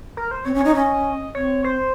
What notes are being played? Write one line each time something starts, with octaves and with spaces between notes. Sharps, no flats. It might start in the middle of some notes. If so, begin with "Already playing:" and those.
A#4
C5
C4 C#5
C#4
D#4 C#5
C#4 D#5
C4 C#5
C5